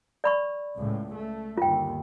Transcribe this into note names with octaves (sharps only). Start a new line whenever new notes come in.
D5 B5 C#6
C#2 A2
A3
G1 D#2 F4 G5